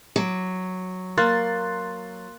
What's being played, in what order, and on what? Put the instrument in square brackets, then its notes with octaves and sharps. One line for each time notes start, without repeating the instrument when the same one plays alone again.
[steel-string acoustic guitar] F#3 [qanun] D6
[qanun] A#3 [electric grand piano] C6 F#6 A6